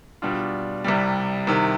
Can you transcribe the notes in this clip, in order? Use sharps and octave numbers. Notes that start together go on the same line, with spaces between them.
B2 G3 D4 F4
C2 C3 G3
C2 C3 D#3